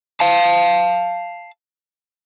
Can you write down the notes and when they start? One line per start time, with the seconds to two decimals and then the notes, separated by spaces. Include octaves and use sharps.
0.20 F5 A5